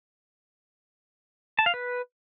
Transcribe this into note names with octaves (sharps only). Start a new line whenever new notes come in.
A5
F5
B4